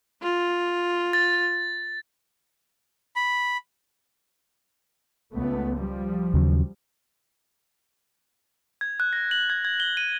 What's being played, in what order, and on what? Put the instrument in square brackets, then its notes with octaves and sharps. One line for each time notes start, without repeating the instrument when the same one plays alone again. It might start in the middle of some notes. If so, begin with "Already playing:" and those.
[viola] F4
[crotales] A6
[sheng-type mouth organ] B5
[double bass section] C#2 A3 B3
F3 G3
[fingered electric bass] D#2 C#3 F#3
[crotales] G#6
F#6
A#6
F#7
G#6
G#6
G7
D#7